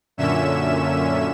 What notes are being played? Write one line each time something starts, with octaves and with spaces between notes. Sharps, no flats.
F#2 A#2 D3 C#4 E5 E7